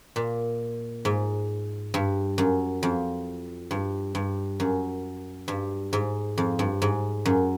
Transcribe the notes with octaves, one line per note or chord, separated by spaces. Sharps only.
A#2
G#2
G2
F#2
F2
G2
G2
F#2
G2
G#2
F2
G2
G#2
F#2